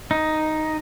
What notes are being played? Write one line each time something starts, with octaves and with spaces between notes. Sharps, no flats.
D#4